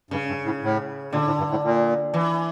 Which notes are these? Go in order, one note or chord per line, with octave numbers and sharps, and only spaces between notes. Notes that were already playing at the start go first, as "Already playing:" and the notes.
G2 C#3
G2
A2
A2
A#2 D3
A2
G2
A2
A#2
E3